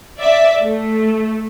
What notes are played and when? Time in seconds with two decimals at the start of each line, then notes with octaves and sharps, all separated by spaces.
0.18 D5 E5
0.61 A3